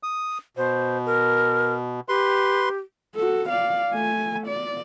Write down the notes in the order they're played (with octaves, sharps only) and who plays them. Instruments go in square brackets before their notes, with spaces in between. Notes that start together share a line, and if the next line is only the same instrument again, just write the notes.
[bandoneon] D#6
[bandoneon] B2 [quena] C5
[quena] A#4
[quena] G4 [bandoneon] B4 C6
[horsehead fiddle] F#4 A4
D5 F5
A3 G#5
D5